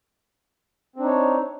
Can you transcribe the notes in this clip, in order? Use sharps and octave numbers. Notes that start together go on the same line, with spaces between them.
C4 D4 D#4 C#5